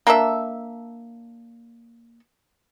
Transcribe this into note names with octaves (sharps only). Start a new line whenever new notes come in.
A#3 D4 A4 E5